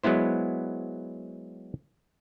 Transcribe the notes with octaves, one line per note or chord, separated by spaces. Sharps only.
F#3 G#3 B3 E4 C5